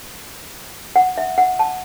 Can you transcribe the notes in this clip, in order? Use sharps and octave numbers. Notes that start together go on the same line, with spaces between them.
F#5
E5
F#5
A5